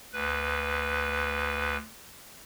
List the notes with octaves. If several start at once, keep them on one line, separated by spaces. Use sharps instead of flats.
D2 B4